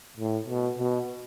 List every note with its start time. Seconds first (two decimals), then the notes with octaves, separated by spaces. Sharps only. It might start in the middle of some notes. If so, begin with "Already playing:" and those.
0.17 A2
0.47 B2
0.78 B2